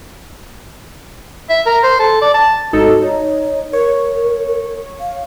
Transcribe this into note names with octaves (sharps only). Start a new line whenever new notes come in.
E5
A#4
C5
A4
D5
A5
G#1 D#4 F#4 A4
D#4 C#5
A#4 C#5
F5